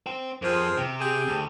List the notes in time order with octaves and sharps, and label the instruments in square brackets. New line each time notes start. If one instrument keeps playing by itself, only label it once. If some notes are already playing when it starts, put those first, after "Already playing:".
[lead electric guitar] C5 G5
[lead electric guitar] F2 [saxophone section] F3 G#4 A#4 [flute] C5
[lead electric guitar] C3 [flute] G5
[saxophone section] G4 G#4
[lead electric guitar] D2